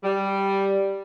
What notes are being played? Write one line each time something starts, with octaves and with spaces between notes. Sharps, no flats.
G3